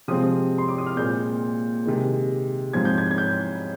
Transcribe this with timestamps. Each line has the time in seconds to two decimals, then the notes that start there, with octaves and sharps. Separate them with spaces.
0.08 C3 F3 G#3 C4 D#6
0.58 C6
0.68 D6
0.78 D#6
0.87 F6
0.96 A#2 G#3 C4 G6
1.86 C3 D#3 G#3
2.73 G#2 F3 C4 G#6
2.85 G6
2.98 G#6
3.11 G#6
3.18 G6